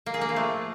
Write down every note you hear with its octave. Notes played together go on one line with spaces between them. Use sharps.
A#3
G#4
A#3
F3
A3